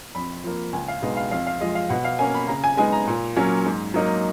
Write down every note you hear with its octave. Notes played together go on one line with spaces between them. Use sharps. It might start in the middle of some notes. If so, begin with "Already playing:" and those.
F2 B5
F3 A#3
C#2 G#5
F5
B2 G#3 B3 D#4 D#5
F5
F2 F5
F5
F3 G#3 D#5
F5
B2 F#5
F5
A#3 C#4 G#5
B5
C#3 A#5
G#5
G#3 B3 D#4 G#5
A#5
A#2
F#3 A#3 C#4
G#2
F#3 A#3 D#4